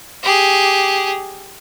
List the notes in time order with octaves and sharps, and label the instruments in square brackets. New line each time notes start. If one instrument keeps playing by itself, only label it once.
[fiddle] G4 G#4